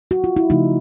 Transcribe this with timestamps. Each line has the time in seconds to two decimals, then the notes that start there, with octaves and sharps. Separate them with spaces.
0.11 F#4
0.24 F4
0.36 E4
0.50 C#3 F3 A3 D#4